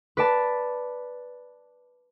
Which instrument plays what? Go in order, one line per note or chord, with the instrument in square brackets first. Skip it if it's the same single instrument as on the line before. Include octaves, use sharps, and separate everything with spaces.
[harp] B4 D5 A5